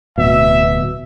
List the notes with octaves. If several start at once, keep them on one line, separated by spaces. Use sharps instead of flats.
D1 B2 E5